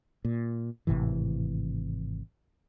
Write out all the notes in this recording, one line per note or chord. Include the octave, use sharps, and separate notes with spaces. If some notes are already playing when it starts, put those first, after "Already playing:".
A#2
G#1 A2 C3 E3